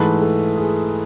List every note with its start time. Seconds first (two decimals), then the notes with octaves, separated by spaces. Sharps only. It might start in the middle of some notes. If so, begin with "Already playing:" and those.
Already playing: G#2 E3 A3 B4
0.22 A4
0.57 G#4